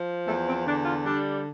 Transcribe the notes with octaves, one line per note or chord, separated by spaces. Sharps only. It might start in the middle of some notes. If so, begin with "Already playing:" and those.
Already playing: F3
E2 A3
C4
D3 D4
F4
G3 D4